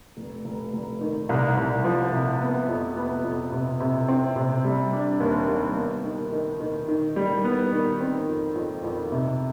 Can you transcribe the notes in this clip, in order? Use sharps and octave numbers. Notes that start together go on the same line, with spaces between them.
F1
F1
F1
D#3
C2
C2
F3
C3
B3
F2
B3
F2
C3
C3
C4
C3
G3
D4
D#2
G3
B3
D#3
D#3
D#3
D#3
G3
B3
D#3
C4
F2
F2
F2
C3